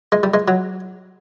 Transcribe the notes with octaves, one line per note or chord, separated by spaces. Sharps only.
G#3
G3
G#3
F#3